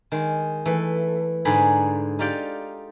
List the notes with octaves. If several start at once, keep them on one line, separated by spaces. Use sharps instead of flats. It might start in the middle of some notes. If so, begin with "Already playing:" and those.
D#3 G#3
E3 A3
G#2 D3 G#4 B5
D#4 F4 G4 D5 F5 G5